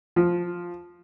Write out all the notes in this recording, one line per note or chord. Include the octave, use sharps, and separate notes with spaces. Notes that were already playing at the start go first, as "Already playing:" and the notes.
F3